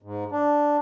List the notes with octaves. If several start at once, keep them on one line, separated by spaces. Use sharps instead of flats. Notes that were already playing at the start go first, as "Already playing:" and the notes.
G#2
D4